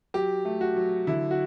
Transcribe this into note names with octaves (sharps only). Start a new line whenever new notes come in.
F#3 G4
A3
F#4
F#3
D3 E4
F#4